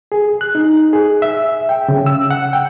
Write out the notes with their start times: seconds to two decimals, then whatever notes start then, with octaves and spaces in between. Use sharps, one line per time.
0.12 G#4
0.41 F#6
0.55 D#4
0.93 G#4
1.22 E5
1.69 G5
1.89 C#3
2.06 E6
2.31 F#5
2.53 G5